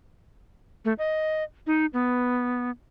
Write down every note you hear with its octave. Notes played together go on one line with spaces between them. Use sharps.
A3
D#5
D#4
B3